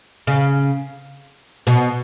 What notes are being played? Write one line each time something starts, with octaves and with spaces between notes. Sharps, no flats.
C#3
B2